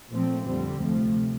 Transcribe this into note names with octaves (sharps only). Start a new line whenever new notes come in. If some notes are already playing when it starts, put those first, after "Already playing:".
A#2 F3 A3 C4
F2 D3 G3 C4
D2 C3 F3 A3